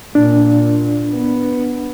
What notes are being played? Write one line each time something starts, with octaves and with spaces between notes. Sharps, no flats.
A#2 D4
B3